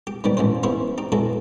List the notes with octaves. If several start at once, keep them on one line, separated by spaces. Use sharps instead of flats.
G4
G#2 B2 D#3 G3
A1 G#2 D#3 C5
B3 C#4 E4 G#4 C5
D#4 G4
B2 F#3 G#3 E4 A4